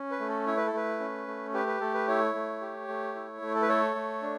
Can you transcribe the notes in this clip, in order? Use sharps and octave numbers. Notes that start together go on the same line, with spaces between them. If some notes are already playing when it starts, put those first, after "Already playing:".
Already playing: C#4
B4
A3
A4
E4 C#5
B4
A4
A3 B4
C#4
A3
G4 B4
B4
A3 A4
B4
E4 C#5
A3
G4
A3
E4
A3
A4
B4
A4 C#5
A3
D4